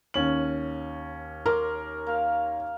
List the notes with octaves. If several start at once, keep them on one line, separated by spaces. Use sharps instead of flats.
D#2 C#4 F#7
A#4 C6 D6
A#3 F5